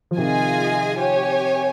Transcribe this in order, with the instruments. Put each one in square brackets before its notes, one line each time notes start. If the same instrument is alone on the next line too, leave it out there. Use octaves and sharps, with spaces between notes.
[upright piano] F3
[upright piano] C3 D#3 [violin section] F4 G#4 D#5 G#5
[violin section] G4 C#5 G#5